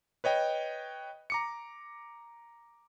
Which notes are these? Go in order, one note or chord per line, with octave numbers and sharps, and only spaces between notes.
B4 C#5 D#5 G5
A#5 D6 C#7